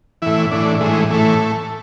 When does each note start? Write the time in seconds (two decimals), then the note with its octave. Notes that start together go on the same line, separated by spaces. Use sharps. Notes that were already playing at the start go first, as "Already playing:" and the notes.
0.22 A2 E3 E4
0.51 A2 E3 D4
0.81 A2 E3 G#3
1.10 A2 E3 A3